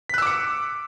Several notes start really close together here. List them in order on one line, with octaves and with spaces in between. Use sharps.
B6 F#6 E6 D6 C#7